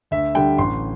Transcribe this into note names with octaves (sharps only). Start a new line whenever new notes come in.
D2 E5
D3 G3 D4 G5
A1 C6